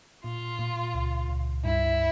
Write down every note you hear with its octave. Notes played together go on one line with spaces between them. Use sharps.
A#2 F4
A#2
C#2
C#2
G2 E4